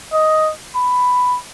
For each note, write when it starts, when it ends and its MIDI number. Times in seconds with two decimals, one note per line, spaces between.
0.13 0.52 75
0.75 1.38 83